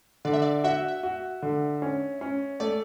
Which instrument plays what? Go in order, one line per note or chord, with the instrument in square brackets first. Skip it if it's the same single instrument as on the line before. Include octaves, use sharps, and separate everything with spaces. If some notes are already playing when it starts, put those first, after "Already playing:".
[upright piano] D3 [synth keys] D5
[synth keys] E5
D5
[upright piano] F#4 [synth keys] E5
[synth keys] E5
[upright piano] F#4
D3
C#4
C#4
[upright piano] A3 [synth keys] D5